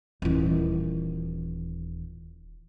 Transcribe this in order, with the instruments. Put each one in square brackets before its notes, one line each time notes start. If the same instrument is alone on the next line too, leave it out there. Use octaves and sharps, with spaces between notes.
[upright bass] D#1 E3